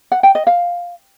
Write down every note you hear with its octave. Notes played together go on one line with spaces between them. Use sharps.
F#5
G5
D#5
F5